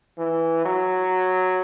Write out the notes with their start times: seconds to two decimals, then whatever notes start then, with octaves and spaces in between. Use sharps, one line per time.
0.18 E3
0.65 F#3